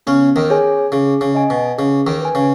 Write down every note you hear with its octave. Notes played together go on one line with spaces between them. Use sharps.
C#3 B3 C#4
D#2 D#3
G#4 C#5 G#5
C#3 G#4
C#3
D#5 G#5
B2
C#3 G#4
D#2 D#3
B4 G#5
C#3